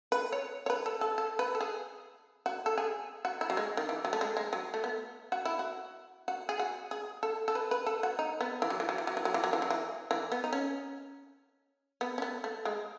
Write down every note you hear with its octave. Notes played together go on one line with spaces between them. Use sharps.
B4
C#5
C#5
B4
A4
A4
A4
B4
A4
G#4
F#4
A4
G#4
F#4
E4
F#3
G#3
D#3
E3
F#3
A3
G#3
G#3
F#3
A3
B3
F#4
E4
F#4
F#4
G#4
F#4
G#4
A4
A4
B4
B4
A4
F#4
D#4
B3
E3
F#3
E3
F#3
E3
F#3
E3
F#3
E3
F#3
E3
F#3
E3
E3
B3
D#4
C#4
B3
C#4
B3
A3
G#3